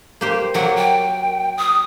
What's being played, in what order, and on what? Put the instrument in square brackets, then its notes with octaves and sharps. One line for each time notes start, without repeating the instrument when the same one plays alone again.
[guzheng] A#3 G4 C5
[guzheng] F#3 A#3 [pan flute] F#5
[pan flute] G5
D#6